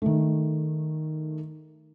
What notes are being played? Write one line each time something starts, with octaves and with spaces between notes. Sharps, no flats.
D#3 A3